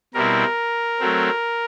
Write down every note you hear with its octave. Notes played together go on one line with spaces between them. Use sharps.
B2 G3 C4 E4 A#4
F#3 A3 C4